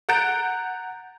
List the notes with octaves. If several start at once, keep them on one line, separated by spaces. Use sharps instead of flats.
F#5 A#5 G6 A6 D7 E7